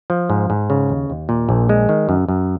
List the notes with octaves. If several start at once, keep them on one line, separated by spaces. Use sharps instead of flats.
F3
G#2
G#2
C#3
D#2
D#2
A#2
A#1
G#3
D#3
F#2
F#2